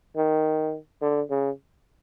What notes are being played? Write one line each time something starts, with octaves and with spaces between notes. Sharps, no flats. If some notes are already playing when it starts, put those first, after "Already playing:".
D#3
D3
C#3